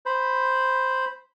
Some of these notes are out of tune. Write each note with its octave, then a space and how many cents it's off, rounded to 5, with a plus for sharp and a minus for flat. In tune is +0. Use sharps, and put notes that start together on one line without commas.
C5 +0 B5 +0